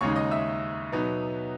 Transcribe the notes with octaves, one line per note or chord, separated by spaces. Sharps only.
D#2 C#3 G#3 D#4 C#5 C#6
D#5 D#6
E5 E6
B2 F#3 B3 D#4